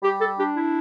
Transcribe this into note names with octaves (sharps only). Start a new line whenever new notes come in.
G3 G4
A4
D4 G4
E4